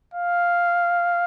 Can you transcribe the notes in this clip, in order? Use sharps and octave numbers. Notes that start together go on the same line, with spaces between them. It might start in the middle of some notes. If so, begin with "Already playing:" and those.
F5